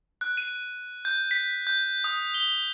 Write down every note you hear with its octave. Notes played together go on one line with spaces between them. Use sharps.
F#6
D#7
G6
B6
G6
D#6
G7